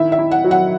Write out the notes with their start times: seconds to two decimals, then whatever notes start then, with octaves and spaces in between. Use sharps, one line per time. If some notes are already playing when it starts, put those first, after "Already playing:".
Already playing: D#3 E4 E5
0.12 E5
0.19 E4
0.31 F#5
0.44 F#3
0.51 F#5